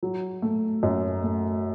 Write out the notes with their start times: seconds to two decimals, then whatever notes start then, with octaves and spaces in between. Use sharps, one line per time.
0.03 F#3
0.42 A3
0.83 F#2
1.23 A3